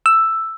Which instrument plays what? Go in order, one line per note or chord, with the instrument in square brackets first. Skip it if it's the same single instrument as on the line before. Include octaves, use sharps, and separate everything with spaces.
[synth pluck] E6